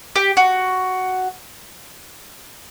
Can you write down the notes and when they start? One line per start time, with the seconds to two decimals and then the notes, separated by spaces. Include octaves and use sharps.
0.16 G4
0.37 F#4